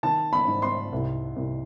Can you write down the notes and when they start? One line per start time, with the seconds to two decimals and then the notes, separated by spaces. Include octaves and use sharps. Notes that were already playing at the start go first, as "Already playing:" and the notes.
0.03 D#3 A5
0.33 B5
0.48 G#2
0.62 C6
0.93 C2
1.36 C2